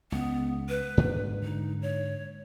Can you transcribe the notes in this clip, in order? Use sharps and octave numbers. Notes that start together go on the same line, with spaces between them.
C#2 B3
B4
G#2 D3 A#3
D#4
C#5